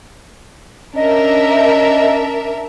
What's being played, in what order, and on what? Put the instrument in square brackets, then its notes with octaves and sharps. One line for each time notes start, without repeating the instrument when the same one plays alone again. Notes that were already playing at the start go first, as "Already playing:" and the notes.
[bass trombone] C#4 [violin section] D4 A#4 E5 [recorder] D#5